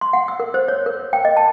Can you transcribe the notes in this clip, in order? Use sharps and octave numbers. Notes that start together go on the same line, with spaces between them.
C6
F#5
E6
A#4
C5
C#5
A#4
G5
D#5
A5